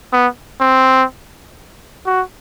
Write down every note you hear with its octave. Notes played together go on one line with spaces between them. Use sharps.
B3
C4
F#4